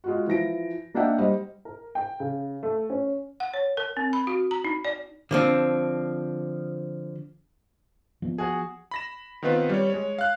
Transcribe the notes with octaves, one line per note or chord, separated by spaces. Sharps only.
G#3 F4 F#4
E3 F3 A#6 D7
A#3 D4 D#4 E5 F#5 G5
G3 C5 D#5
A#4
G5
C#3
A3
C#4
F#5
C#5
A#4
C4
B5
F#4
A#5
D#4
D5
D3 F3 C4
F3 B3
F#4 G#4
B5 A#6 E7
D#3 B3 C4 F4 B4
G3 C#5
G#3 C#5
F5 F#6